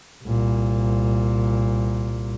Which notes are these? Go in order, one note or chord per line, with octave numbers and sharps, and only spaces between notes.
C2 A#2